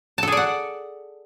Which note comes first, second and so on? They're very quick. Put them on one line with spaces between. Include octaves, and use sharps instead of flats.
A5 A4 G#4 D5 F#5